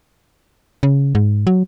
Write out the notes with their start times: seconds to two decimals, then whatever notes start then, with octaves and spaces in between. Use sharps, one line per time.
0.83 C#3
1.15 G#2
1.47 F#3